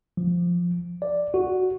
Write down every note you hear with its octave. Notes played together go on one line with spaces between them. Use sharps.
F3
D5
F#4